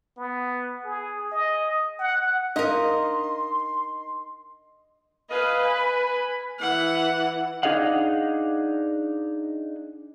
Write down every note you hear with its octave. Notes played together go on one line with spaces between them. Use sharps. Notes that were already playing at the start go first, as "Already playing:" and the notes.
B3
G#4
D#5
F#5
D4 D#4 A#4 D#5 F5 C6
G#4 B4 D#5 F5
G#5 B5
E3 F#5
D4 D#4 G#4 D#5 F5 F#5